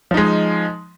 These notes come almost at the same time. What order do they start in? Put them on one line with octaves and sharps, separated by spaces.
F3 D#4 G#3